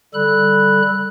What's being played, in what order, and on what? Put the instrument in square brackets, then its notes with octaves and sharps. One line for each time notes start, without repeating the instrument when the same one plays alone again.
[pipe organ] D3 G3 A4 B5 F#6